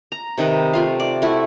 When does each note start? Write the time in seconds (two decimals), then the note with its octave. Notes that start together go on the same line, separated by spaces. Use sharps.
0.12 A#5
0.38 C3 D#3 D#4 B4
0.73 A3 F4 F5
1.00 D5
1.22 A3 E4 F#4